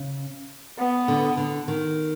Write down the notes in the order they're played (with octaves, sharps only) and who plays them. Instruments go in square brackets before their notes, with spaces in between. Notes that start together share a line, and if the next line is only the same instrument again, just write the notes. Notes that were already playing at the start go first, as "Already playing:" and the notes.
Already playing: [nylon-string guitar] C#3
[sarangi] B3
[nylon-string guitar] D3
D3
D#3